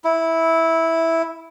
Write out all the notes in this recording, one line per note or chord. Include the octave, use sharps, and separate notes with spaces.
E4